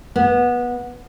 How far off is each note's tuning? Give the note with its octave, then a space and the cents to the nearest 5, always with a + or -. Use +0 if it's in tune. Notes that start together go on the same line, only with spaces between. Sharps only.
B3 -20